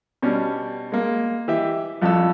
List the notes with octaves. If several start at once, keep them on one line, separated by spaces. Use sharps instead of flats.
B2 G3 C#4 D4
G#3 A#3
E3 G4 D#5 E5
A#1 F2 A5 E6